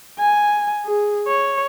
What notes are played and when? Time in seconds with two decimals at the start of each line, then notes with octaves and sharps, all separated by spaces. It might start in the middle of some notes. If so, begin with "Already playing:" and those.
0.19 G#5
0.85 G#4
1.28 C#5